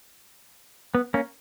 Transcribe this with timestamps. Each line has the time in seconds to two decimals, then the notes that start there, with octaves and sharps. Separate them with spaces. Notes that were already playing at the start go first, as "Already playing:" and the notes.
0.95 B3
1.14 A#3 C#4